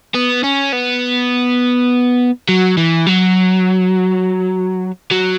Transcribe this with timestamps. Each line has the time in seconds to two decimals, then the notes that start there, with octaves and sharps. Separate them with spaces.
0.14 B3
0.43 C#4
0.72 B3
2.49 F#3
2.78 E3
3.06 F#3
5.11 F#3